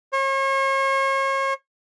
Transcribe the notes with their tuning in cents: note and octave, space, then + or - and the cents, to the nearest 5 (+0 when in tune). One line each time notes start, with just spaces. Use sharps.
C#5 -40